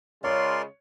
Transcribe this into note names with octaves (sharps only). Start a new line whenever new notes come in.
C#3 G#3 F4 A#4 C#5 D5 C6